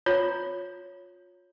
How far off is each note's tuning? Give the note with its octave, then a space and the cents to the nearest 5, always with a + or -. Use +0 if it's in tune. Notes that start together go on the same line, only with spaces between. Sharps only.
F4 +30 C#5 +0 A#5 +0